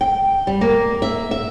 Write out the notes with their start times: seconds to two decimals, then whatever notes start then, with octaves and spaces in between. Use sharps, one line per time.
0.01 G5
0.47 G3
0.61 A#3
1.02 E5
1.31 E5